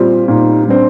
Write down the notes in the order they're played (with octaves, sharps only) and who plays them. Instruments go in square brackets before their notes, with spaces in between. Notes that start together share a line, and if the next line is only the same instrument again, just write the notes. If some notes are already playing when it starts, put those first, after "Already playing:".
Already playing: [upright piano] A#2 G3 C4 [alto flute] F4
[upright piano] A#2 [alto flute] D#4
[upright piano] G3 C4 [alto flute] D4